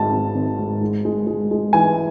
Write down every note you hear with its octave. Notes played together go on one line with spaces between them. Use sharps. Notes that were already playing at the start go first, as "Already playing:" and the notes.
Already playing: G#1 G#2 A5
G#1
G#1
G#2
G#3
G#3
G#3
G#3
E3 G#5